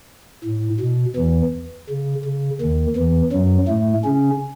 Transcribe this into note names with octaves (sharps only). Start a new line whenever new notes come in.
A2
B2
E2 E3
C#3
C#3
D#2 D#3
E2 E3
F#2 F#3
A2 A3
C#3 C#4